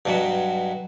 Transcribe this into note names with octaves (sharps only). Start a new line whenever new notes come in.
G2 B2 F#3